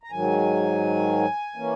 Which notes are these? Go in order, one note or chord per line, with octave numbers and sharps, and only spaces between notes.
A#5
G#2 D#3 F#3 G#5
E3 A#3 C#4